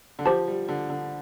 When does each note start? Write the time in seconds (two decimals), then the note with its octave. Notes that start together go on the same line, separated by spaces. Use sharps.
0.19 D3
0.25 F3 G4 C5 A5
0.48 G3
0.69 D3
0.90 D3